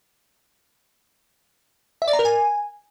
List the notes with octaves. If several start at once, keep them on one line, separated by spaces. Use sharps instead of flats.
E5
D5
A#5
A#4
G#5